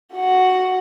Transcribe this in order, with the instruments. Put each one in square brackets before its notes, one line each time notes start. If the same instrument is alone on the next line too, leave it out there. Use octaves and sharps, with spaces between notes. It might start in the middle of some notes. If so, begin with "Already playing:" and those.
[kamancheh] F#4 F#5